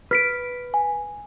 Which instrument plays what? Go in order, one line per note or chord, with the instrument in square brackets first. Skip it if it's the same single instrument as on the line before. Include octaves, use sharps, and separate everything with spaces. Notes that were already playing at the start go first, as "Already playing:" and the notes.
[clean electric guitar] B4 [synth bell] F6 B6 D7
[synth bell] G#5